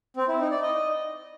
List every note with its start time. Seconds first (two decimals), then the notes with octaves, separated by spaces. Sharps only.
0.17 C4
0.28 E4
0.40 D#4
0.51 D5
0.63 D#5